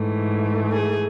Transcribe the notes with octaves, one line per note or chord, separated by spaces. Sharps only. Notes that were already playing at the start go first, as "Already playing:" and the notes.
Already playing: G#2 E3 A3
G#4